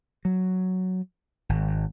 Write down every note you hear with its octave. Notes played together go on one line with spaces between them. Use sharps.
F#3
G#1